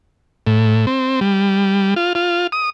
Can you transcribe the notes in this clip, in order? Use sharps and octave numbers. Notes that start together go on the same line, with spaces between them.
A2
C4
G3
F4
F4
D#6